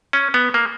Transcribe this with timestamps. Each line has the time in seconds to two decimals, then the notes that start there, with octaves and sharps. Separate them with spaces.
0.13 C#4
0.34 B3
0.54 A#3